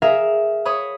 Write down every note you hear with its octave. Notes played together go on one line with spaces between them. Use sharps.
G#4 A#4 E5 F5
C#5 B5 D#6